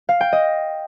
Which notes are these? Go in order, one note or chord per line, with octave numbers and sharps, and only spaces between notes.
F5
G5
D#5